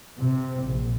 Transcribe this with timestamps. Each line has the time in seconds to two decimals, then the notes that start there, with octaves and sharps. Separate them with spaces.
0.20 C3
0.66 A#1